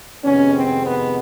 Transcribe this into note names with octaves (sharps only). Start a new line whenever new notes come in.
F2 C3 D#3 G#3 B3 C#4
C4
B3